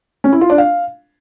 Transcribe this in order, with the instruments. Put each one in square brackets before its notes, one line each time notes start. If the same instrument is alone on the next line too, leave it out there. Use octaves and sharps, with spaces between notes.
[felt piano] C#4
E4
F4
D4
F5